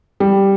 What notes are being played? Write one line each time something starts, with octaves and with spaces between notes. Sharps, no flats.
G3